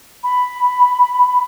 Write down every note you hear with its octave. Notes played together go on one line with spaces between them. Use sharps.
B5